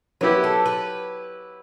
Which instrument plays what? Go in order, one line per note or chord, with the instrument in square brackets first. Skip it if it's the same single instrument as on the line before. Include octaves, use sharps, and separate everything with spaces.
[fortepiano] F#3 B3 E4 G4 [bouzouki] B4
[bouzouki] A4
B4